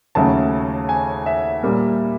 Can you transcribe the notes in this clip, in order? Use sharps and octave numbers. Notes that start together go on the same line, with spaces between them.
D#2 C#3 F#3 A3 A5
G#5
E5
A#2 G3 A#3